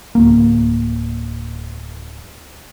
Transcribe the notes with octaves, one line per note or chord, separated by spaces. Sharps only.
D1 A#3